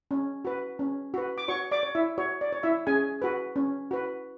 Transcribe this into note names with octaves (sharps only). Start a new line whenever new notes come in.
C#4
F#4 B4
C#4
F#4 B4
D6
F#4 C#5 C#6
D5 D6
C#5
E4 E5
F#4 C#5
D5
C#5
E4 E5
C#4 G#4 G#5
F#4 B4
C#4
F#4 B4